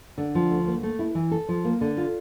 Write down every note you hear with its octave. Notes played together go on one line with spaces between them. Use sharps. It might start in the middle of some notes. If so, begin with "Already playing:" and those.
D3
F3
D2
A#3
A3
E4
E3
A4
F3
A#3
D3
F4